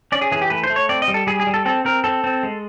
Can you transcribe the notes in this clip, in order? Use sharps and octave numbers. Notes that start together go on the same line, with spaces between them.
C#4 D5
G#4
E3 G#4
G4
A3 B4
C5
A3
C#5
C4 D5
D#5
G3
A4
G3 G#4
G#4
G3
A4
C4 A4
C4 A#4
C4 A4
C4
G#3